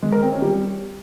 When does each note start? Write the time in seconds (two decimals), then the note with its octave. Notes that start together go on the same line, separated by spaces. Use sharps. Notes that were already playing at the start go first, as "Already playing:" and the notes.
0.03 G#3
0.12 A#4
0.22 C4
0.32 C#4
0.42 G3